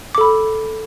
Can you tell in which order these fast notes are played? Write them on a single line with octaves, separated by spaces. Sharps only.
D6 A4 B5